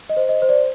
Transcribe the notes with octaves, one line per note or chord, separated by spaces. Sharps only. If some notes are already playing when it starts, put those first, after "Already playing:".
D#5
C5
D#5
C5
D5